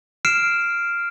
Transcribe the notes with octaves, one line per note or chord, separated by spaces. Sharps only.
F6 C7 D7 E7